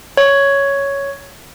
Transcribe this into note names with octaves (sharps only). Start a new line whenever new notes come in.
C#5